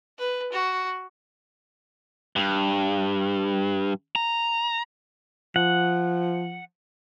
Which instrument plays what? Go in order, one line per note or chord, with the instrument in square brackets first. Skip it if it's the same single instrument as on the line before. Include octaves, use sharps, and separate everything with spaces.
[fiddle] B4
F#4
[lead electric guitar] G2
A#5
[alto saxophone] F3 [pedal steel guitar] F#5